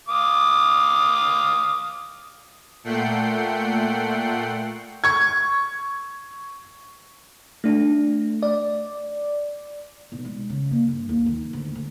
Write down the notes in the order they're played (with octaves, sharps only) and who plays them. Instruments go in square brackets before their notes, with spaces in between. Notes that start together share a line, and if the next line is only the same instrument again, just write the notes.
[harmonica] F5 D6 D#6
[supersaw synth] A#2 A3 F#5 G5 C7
[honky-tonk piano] C#6 G#6
[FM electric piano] A3 D4
D5
[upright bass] B1
G#3
C#3
A#3
G2
D#2
D#3
D2
D2